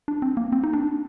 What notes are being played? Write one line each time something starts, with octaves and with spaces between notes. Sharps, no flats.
D4
C4
A#3
C4
D#4
D4